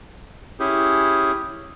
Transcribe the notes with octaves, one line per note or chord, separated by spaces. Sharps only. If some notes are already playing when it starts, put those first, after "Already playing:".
C#4 E4 G4 G#4